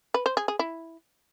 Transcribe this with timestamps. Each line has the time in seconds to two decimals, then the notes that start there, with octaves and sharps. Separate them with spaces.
0.14 B4
0.26 C5
0.37 G#4
0.48 G#4
0.59 E4